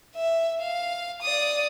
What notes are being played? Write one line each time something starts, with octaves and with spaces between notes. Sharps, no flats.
E5
F5
D5 D#6